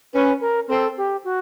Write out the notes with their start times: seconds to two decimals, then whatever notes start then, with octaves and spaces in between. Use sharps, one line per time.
0.14 C#4 B4
0.41 A#4
0.69 C4 A4
0.97 G4
1.24 F#4